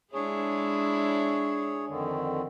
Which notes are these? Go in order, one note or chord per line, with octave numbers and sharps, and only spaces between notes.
G#3 D4 E4 G#4 C#5
F2 D3 D#3